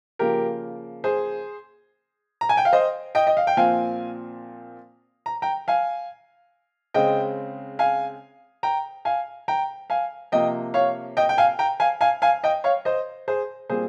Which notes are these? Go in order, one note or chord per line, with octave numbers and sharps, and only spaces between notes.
C#3 F3 A#3 G4 A#4
G#4 C5
A#5
G#5
G5
F5
C5 D#5
D#5 G5
D#5
F5
G5
A#2 F3 C4 F5 G#5
A#5
G5 A#5
F5 G#5
C#3 G#3 C4 D#5 G5
F5 G#5
G5 A#5
F5 G#5
G5 A#5
F5 G#5
C3 F3 A#3 D#5 G5
C#5 F5
D#5 G5
G5
F5 G#5
G5 A#5
F5 G#5
F5 G#5
F5 G#5
D#5 G5
C#5 F5
C5 D#5
G#4 C5
A#2 G3 C4 G#4 C5